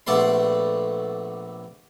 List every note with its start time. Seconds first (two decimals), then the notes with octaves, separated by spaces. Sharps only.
0.07 A#1 A3 B3 A4 D5 C6